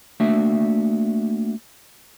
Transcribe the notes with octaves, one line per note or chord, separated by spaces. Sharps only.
A3 A#3 D4 F#4 E5